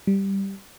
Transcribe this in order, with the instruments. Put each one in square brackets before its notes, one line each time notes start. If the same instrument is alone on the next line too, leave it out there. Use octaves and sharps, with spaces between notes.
[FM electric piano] G3